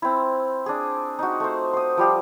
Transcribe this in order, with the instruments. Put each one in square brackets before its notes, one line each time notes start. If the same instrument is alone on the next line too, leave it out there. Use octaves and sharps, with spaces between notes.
[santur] C4 E4
D4 G#4
D#4 F#4
A3 C5
C5 D#6
F3 G3 G4